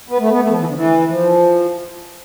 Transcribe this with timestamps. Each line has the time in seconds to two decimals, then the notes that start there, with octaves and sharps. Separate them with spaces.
0.08 B3
0.20 A3
0.31 B3
0.41 A3
0.49 F3
0.58 E3
0.66 D3
0.75 E3
1.07 F3